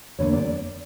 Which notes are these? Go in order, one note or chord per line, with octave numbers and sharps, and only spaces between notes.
E2 D3 A#3 C#5
D5